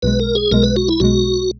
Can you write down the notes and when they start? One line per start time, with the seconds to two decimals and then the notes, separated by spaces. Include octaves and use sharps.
0.02 B1 B2 G#3 B4
0.20 A#4
0.35 G#4
0.51 B1 B2 G#3 A#4
0.63 B4
0.76 F#4
0.88 E4
1.00 B1 B2 G#3 F#4